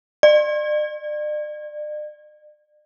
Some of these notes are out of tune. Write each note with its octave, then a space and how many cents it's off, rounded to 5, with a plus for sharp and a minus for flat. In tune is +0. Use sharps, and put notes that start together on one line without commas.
D5 +40